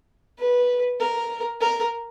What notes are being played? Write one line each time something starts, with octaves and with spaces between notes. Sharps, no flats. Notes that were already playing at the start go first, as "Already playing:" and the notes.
B4
A#4
A#4